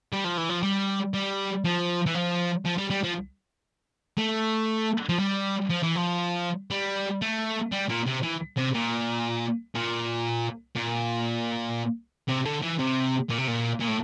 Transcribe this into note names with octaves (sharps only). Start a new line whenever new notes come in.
G3
F3
E3
F3
G3
G3
F3
E3
F3
F3
G3
G3
F3
A3
F3
G3
F3
E3
F3
G3
A3
G3
A#2
C3
E3
C3
A#2
A#2
A#2
C3
D3
E3
C3
A#2
C3
A#2
A#2
A2